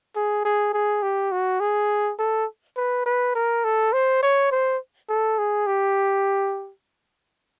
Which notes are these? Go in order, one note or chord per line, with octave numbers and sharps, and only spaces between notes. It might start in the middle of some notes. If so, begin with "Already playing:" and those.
G#4
G#4
G#4
G4
F#4
G#4
A4
B4
B4
A#4
A4
C5
C#5
C5
A4
G#4
G4